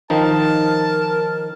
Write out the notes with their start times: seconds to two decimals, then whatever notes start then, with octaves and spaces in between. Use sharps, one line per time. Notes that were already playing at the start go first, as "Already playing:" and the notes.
0.10 D#3 F3 D#4 A#4 A5